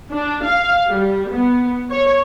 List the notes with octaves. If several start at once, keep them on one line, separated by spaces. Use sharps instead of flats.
D4
F5
G3
B3
C#5